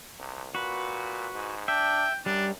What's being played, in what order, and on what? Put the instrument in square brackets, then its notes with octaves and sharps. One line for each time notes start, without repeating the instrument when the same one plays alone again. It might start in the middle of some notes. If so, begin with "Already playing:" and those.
[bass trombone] C2
[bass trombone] A#2 [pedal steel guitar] F#4 B4
[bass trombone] G#2
[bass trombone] D4 [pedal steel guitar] E5 [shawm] G5
[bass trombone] F#2 [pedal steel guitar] G3 [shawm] D4